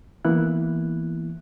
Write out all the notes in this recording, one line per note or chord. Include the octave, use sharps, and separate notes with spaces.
E3 A#3 B3 E4 F#6